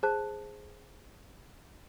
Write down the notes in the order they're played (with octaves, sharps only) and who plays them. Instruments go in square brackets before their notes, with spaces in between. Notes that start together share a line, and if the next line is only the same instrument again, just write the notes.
[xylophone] G#4 C5 A5 F#6